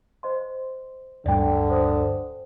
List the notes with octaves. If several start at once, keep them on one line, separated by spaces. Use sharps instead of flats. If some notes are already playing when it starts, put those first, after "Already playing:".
C5 D#5 C6
D1 G2 D3 G3 D5 G5
A4 C5 D#6